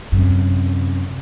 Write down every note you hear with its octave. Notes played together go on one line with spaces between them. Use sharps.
F#2 C3